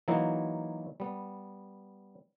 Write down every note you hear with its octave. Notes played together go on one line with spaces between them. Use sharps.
E3 F#3 A#3 D#4 E4 F#4
G3 B3